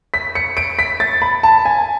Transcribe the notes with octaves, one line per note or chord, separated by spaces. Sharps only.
B6
C#7
D7
B6
A6
B5
A5
G#5